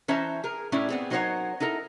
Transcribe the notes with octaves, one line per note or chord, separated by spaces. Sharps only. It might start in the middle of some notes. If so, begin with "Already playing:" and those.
E3 C#4 C5 E5 A5 A#5
G#4 A#4
A2 C#4 D4 E4 E5
B3 C4 G#4
F#3 D#4 A#4 C5 C#5 F#5
D#4 E4 A4 A#4